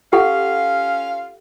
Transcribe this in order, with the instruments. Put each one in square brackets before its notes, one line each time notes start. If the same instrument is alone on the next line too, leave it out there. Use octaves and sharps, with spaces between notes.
[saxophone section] C#4 F4 F5 [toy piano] G4 A4 F#5